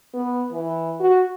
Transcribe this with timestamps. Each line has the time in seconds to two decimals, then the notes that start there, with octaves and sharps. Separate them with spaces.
0.14 B3
0.53 E3
1.00 F#4